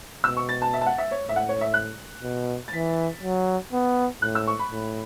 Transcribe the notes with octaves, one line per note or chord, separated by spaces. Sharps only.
B2 E6
C#6
A6
A5
E5
A5
F#5
E5
C#5
A2
E5
F#5
C#5
E5
F#6
B2
A6
E3 B6
F#3
B3
A2 F#6
E6
C#6
B5
A2